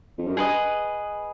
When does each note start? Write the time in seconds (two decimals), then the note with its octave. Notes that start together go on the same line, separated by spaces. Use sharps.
0.18 F2
0.27 F#2
0.37 G2 G#4 B4 D#5